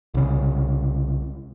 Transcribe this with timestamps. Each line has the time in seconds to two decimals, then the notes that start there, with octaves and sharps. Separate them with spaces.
0.14 C2 C#3